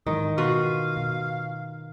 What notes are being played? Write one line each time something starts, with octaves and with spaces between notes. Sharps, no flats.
G#2 D#3 E3 D#6
B2 F4 F#4 B4 F5
B2